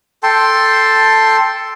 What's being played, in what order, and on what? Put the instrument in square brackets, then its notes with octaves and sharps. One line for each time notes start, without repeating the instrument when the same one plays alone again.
[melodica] A4 G5 A5 C6